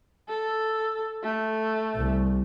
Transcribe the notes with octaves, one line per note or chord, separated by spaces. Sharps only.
A4
A3
C2